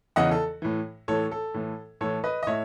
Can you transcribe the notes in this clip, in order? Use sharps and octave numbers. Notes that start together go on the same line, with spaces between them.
E2 C#3 E3 D#5 F#5
A4
A2 E3
A2 E3 A4 C#5
A4
A2 E3
A2 E3 A4 C#5
B4 D#5
D#5
A2 C#5 E5